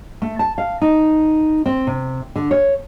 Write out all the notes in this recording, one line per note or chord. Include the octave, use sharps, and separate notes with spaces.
A3
A5
F5
D#4
C4
C3
D3
C#5